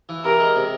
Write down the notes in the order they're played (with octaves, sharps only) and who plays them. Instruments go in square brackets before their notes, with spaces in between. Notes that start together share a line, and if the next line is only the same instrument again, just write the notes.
[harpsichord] E3
[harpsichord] C3 [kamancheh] A#4
[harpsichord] G#3
C3